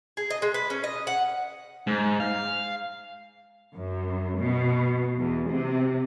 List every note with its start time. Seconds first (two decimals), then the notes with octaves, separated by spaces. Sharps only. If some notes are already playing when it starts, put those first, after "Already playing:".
0.17 G#4
0.30 D#5
0.42 G#3
0.54 B4
0.70 C#4
0.84 D#5
1.07 F#5
1.87 G#2
2.20 F5
3.74 F#2
4.38 B2
5.18 E2
5.50 C3